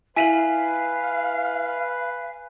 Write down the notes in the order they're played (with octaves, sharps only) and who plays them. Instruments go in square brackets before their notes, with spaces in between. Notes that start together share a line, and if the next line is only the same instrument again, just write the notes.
[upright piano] E4 D#7 F#7 [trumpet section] B4 [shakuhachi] F5 [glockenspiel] G#5 B6